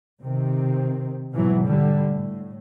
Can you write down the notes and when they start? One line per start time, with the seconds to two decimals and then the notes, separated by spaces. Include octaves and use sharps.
0.22 C3 D#3 C4
1.34 G#2 B2 E3 F#3
1.65 D3 G3
2.05 A2